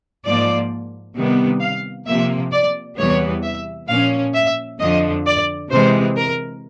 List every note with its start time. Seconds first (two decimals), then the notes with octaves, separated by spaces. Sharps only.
0.24 G#2 F3 A#3 D5
1.15 C3 D#3 G3 B3
1.61 F5
2.06 C3 F3 A#3 E5
2.51 D5
2.97 E2 C3 E3 G3 B3 C#5
3.42 E5
3.88 A#2 F3 A#3 C#4 F5
4.34 E5
4.79 F2 D3 F3 D#5
5.25 D5
5.70 C3 E3 G#3 C4 C5
6.16 A#4